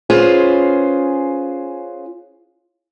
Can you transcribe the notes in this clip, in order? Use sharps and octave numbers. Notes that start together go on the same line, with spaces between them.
C#4 F4 G#4 B4 C5